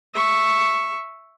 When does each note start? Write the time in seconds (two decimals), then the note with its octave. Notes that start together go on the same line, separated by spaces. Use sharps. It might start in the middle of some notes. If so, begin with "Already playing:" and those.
0.15 E5 C#6